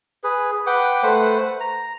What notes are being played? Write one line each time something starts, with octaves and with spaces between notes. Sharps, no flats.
G#4 B4
B4 F#5 G5 D6
A3 B4 C5 F#5
A#5